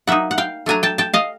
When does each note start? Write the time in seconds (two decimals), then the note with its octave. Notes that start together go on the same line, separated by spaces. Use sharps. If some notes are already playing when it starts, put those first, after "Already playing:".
0.07 F#3 A#3 D#4 E5 F#5
0.31 F#5
0.38 F5 G5
0.66 F#3 A3 D4 G#5 A#5
0.83 G5 A5
0.98 G5 A5
1.14 D#5 F5